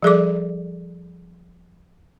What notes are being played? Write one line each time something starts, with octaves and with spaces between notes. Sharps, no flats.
F3 G3 G#4 A4 D5 D6